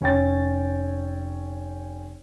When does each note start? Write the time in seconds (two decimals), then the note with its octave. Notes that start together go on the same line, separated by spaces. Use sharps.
0.01 F1 C#4 C#5 G5 A6